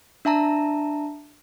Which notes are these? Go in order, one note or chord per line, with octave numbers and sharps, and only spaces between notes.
D4 E5 A5 A#5